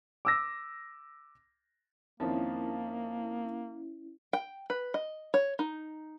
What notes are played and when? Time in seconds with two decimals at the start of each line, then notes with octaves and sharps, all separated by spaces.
0.25 D6 E6 A#6
2.20 F2 D#3 F3 A#3 C#4 E4
4.33 G5
4.70 B4
4.94 D#5
5.34 C#5
5.59 D#4